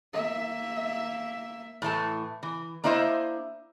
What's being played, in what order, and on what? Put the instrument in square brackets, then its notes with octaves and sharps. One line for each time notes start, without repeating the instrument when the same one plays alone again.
[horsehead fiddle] A#3 E5
[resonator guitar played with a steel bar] A2 E3 A3 A5
E3
A#3 D4 E4 C5 D#5 E5